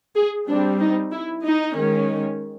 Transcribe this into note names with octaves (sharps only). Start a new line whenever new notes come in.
G#4
G3 C4 D4
D#4
E4
D#4
D#3 G#3 C#4